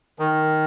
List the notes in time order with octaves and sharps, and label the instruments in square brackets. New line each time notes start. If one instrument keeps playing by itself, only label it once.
[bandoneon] D#3